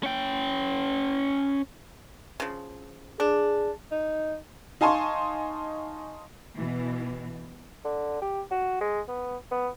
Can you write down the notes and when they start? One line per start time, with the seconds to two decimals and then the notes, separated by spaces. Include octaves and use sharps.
0.03 C#4 G5
2.40 C#3 F3
3.20 D4 G#4
3.92 D#4
4.81 D#4 F5 G#5 A5 C6 C#6
6.55 B2 E3
7.84 D3
8.21 G4
8.51 F#4
8.81 G#3
9.08 B3
9.51 B3